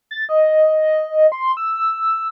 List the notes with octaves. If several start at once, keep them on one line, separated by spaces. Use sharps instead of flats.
A6
D#5
C6
E6